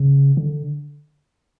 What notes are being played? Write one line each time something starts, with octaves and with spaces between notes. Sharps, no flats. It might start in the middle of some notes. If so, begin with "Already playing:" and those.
Already playing: C#3
D3